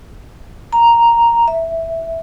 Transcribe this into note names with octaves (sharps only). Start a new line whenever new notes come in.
A#5
E5